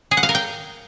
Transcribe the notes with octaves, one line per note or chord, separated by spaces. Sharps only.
G#4
F#5
F5
A#4
G5